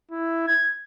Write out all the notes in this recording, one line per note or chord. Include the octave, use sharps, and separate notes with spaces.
E4
G#6